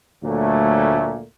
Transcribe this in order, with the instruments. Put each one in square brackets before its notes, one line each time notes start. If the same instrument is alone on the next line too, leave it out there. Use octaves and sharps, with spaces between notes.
[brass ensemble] D2 A#2 F#3 A3